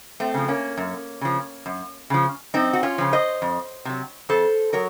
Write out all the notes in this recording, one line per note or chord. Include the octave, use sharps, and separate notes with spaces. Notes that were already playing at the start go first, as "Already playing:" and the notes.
A3 C4
C#3 F3
A#3 C#4
F#2
C#3 F3
F#2
C#3 F3
F#2 C4 D#4
F#4
C#4 F4
C#3 F3
C5 D#5
F2
C3 F#3
F2 A4 C5
F#3 A#4 C#5